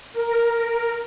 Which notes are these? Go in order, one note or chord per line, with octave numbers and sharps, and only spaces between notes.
A#4